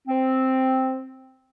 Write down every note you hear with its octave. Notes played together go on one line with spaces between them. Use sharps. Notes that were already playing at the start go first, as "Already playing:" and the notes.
C4